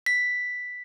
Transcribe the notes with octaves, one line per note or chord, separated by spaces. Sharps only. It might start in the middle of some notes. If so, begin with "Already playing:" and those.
B6